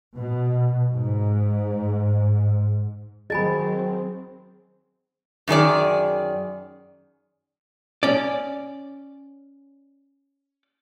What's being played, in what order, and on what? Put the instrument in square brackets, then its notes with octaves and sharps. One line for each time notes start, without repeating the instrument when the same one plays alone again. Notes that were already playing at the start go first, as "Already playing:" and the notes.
[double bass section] B2
G#2
[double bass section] D#3 F#3 C4 [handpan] G#4 [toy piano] D#5 G#5 B5
[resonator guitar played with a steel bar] F#2 D#3 G#4 D5
[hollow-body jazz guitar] C#4 D5